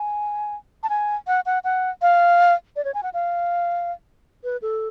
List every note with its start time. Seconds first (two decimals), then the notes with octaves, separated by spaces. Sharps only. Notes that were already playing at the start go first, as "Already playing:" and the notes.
Already playing: G#5
0.83 A5
0.90 G#5
1.27 F#5
1.46 F#5
1.64 F#5
2.02 F5
2.76 D5
2.85 C#5
2.94 G#5
3.03 F#5
3.14 F5
4.44 B4
4.62 A4